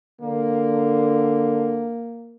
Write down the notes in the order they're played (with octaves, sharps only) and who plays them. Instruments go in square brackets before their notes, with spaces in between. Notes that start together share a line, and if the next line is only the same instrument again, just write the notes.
[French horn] D3 [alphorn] A#3